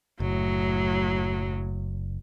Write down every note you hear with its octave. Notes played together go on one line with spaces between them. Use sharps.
F#1 A2 F#3